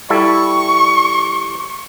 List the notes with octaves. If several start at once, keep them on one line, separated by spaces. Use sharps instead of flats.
G3 E4 A4 C#6